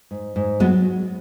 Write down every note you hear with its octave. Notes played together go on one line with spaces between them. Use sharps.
G#2
G#2
F#3 G#3 B3